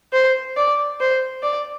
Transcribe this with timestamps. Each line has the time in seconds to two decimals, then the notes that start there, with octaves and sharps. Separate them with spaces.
0.13 C5
0.57 D5
1.00 C5
1.43 D5